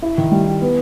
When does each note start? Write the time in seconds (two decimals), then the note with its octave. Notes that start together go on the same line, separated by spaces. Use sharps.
0.02 E4
0.18 D#3
0.31 G3
0.47 E4
0.61 B3